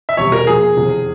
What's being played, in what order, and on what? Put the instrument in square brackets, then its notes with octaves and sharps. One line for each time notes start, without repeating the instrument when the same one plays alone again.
[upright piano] E5
[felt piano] E1 E2 C3 G3 [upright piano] C#5
[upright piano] A#4
[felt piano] A#2 F3 A#3 [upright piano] G#4
[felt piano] F1 E2 C3